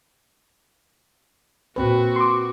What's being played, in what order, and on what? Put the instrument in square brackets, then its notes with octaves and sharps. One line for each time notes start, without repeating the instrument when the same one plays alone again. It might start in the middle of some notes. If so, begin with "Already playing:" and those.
[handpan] A#2 C4 B4 [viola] F#4
[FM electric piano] C6 D6